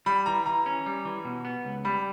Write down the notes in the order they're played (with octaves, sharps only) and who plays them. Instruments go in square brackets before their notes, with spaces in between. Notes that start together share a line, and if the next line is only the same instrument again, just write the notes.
[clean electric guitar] G3 [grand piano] B5
[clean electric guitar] E3 [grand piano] A#5
[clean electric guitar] E3 [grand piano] A#5
[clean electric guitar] C#4
G3
E3
B2
B3
C#2
[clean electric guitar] G3 [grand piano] B5